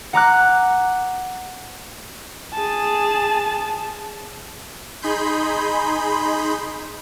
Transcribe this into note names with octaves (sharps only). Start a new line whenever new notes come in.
F#5 A#5 D6 F#6
G#4 A5
D#4 G#4 B5 C6 G6